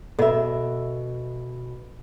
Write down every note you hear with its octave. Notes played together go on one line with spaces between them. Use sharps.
B2 A4 D#5 E5